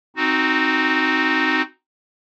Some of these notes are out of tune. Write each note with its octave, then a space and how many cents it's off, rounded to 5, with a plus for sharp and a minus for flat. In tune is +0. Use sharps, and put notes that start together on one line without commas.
C4 +0 D#4 +0 F#4 +0